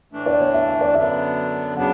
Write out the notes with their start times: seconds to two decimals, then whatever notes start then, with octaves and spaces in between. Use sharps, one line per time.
0.13 A2 E3 A3 D4
0.26 D5
0.40 C#5
0.54 E5
0.67 E5
0.81 D5
0.94 F#2 D3 F#3 B3 D4 E5
1.77 C#3 F#3 B3 D4 F#5